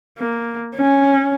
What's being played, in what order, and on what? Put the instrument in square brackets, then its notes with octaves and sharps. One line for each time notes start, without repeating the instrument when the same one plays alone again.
[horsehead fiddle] A#3
C#4